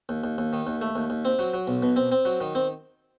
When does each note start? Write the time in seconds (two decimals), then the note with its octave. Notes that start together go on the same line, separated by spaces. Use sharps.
0.09 D#2
0.24 D#2
0.38 D#2
0.53 D#3
0.67 D#2
0.82 A3
0.95 D#2
1.10 D#2
1.25 C4
1.39 F#3
1.54 F#3
1.67 B1
1.82 B2
1.96 C4
2.12 C4
2.25 F#3
2.41 D#3
2.55 C4